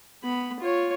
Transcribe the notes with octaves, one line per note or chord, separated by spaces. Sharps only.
B3 B5
F4 C#5